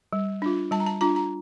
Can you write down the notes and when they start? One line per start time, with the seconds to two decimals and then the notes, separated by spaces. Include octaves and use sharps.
0.13 G3
0.42 D4 F4
0.71 G3 A5
0.80 A#5
0.86 A5
1.01 D4 F4 A#5
1.16 A#5